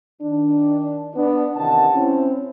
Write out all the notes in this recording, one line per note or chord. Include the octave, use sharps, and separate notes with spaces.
D#3 D4
B3 D4
C3 D#3 E3 F#5 A5
C4 C#4 E4